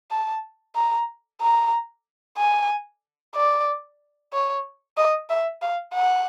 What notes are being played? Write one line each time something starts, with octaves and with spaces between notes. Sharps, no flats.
A5
A#5
A#5
G#5
D5
C#5
D#5
E5
F5
F#5